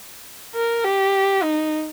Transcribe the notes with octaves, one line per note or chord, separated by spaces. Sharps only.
A#4
G4
D#4